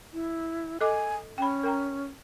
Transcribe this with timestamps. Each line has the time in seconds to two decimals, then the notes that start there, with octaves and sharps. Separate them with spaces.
0.13 E4
0.81 A4 D#5 G#5 D6
1.38 C#4 G5 B5
1.63 A#4 G5 A#5